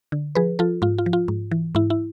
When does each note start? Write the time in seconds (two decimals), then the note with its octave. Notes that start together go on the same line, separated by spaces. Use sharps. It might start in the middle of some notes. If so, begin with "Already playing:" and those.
0.12 D3
0.35 F3 G#4 B4
0.59 F3 F4 A4
0.82 G#2 F4
0.98 F4
1.06 F3
1.13 F4
1.28 G#2
1.51 E3
1.75 G#2 E4
1.90 E4